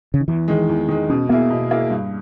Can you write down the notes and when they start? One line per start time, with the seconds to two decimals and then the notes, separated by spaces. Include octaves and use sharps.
0.14 C#3
0.21 D#3
0.28 E2 E3
0.48 D#3 G#3
0.69 E2
0.89 D#3 G#3
1.10 B2 C#4
1.29 A#3 B3 E4 G#4
1.50 B2
1.71 A#3 E4 G#4
1.90 G2